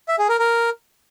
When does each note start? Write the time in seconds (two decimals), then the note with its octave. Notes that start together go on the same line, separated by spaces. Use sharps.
0.09 E5
0.19 G#4
0.29 A#4
0.39 A#4